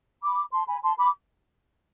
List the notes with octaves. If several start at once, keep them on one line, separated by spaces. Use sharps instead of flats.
B5 D6
A5 C6
G#5 B5
A5 C6
B5 D6